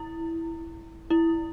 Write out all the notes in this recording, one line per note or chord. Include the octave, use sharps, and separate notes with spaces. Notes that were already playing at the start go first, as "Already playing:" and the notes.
Already playing: E4
E4